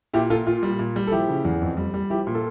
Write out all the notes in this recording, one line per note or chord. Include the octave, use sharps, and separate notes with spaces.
A#2 E4 G4
A#2 F4 A4
A#2 F4
G3
A#2
G3
A4
F3 E4 G4
C#3
E2
F2
G3
G3
F3 E4 G4
A#2
F4 A4